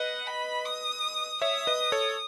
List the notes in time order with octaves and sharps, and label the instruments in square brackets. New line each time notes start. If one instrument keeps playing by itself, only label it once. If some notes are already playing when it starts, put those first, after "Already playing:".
Already playing: [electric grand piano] B4 D#5 [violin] F#5
[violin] B5
D#6
[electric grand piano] C#5 E5 [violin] D#6
[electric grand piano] B4 D#5
A4 C#5